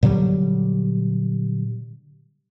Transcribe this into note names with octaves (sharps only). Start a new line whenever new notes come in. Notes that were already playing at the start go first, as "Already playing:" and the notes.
A#2 D3 F#3 G3